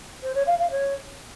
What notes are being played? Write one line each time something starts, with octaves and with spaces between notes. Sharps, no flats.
C5
C#5
F5
F5
C#5